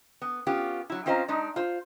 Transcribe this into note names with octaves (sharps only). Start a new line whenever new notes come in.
B3
B3 C#4 F4 G4
F#3 E4
C4 C#4 F4 C5 D#5 A#5
G#3 D4 D#4
F4 C5